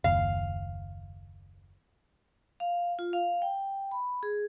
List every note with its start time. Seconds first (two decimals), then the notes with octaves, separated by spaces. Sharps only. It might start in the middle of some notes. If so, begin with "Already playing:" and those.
0.04 F#1 D#2 F5
2.60 F5
2.99 F4
3.13 F5
3.42 G5
3.91 B5
4.23 G#4